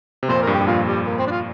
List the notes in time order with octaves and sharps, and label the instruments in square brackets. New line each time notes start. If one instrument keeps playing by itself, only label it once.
[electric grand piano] C3
[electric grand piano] F2 A#2 [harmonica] C5
[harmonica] A#4
[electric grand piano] G2
[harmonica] G4
[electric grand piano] G2
[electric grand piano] F2 A#2 [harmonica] F4
[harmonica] G3
A#3
C4
D4
F4